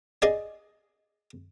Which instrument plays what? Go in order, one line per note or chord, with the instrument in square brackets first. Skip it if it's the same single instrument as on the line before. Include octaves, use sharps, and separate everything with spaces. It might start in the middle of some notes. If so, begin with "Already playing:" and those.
[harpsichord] G#4 D5 D#5 G#5